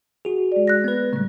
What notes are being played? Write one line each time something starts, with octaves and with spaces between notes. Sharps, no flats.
F#4 G#4
G#3 D5
F#6 A#6
B3 B4
A2 C#3 G3 A3